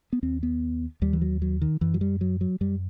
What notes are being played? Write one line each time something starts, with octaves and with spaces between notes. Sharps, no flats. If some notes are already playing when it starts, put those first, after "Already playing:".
B3
D#2 C4
B3
D#2 G3
E3
F#3
F#3
D#3
F#2 E3
F#3
G3
F#3
F#3
F#2 G3